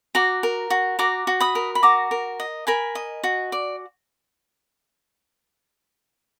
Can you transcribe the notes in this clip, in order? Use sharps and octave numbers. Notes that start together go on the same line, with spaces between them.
F#4 A#5 D6
A#4
F#4
F#4 A#5 D6
F#4
B5 D#6
A#4
B5
F#4 A#5 D6
A#4
D#5
A#4 G#5 B5
D#5
F#4
D5